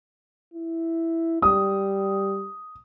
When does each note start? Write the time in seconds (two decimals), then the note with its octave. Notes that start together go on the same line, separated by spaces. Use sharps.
0.54 E4
1.42 G3 D#6